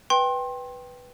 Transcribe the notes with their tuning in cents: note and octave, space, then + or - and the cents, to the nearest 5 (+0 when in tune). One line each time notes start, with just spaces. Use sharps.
B4 +0 G5 +0 C6 +30